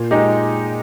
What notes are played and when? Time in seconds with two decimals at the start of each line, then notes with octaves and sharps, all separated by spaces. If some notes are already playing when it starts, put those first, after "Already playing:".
Already playing: A#2
0.11 G#3 D#4 G4